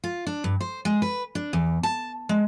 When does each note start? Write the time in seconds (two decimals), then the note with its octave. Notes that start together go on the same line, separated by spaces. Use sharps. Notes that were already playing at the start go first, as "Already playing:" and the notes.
0.04 F4
0.27 D4
0.44 G2
0.60 C5
0.85 G#3
1.02 B4
1.35 D4
1.53 E2
1.83 A5
2.29 G#3